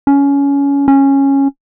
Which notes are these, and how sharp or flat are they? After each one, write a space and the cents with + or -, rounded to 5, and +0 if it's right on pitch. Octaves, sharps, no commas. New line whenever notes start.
C#4 +20
C#4 -10